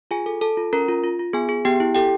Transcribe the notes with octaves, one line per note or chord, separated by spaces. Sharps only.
F4 G#4 G#5
A4
A4 A5
F4
C#4 A#4 A#5
F4
F4
F4
B3 G#4 G#5
G#4
B3 G4 G5
E4
G4 A4 G5